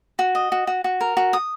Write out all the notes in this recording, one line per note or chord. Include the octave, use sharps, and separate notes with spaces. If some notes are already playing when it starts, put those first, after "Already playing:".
F#4
D#5
F#4
F#4
F#4
A#4
F#4
D#6